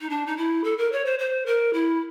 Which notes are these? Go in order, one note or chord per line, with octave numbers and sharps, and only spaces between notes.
D#4
D4
D#4
E4
A4
A#4
C#5
C5
C5
A#4
E4